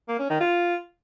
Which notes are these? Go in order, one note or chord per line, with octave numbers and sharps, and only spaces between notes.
A#3
C#4
D#3
F4